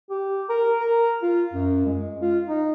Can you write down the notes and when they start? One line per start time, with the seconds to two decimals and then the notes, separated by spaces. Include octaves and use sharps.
0.10 G4
0.49 A#4
0.80 A#4
1.23 F4
1.53 F#2
1.86 G#3
2.22 F4
2.48 D#4